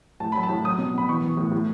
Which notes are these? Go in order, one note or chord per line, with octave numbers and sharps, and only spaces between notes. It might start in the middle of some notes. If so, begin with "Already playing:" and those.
A2 A5
F#3 B5
A5
A2
F#3 D#6
B2
B2 B5
E3 C#6
E3
A2
A2